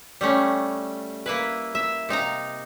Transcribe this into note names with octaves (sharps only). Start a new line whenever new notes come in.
G3 A3 C#4
A#3 E4 B4
E5
C3 D#4 F5 A#5